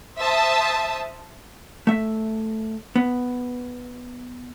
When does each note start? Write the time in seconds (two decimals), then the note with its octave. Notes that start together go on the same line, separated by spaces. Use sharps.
0.17 C5 E5 A5 D#6
1.87 A3 E5
2.96 B3